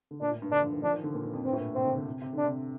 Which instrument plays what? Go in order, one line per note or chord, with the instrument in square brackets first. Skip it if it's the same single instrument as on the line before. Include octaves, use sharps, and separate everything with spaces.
[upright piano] D3
[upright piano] A#2 [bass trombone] D4
[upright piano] A2
G2
[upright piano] D3 [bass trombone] D4
[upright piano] F3
D#3
[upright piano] F3 [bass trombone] D4
[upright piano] D#3
D3
A#2
G2
F2
[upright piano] G2 [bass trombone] C4
[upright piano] A2
A#2
[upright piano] C3 [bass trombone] C4
[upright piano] D3
D3
C3
C3
[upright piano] D3 [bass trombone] D4
[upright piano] C3